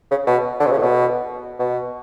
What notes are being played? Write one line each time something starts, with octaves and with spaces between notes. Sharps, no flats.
C#3
B2
D3
B2
C#3
A2
B2
B2